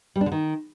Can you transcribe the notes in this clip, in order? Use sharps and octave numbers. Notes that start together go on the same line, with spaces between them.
G3
D4
D3
D#3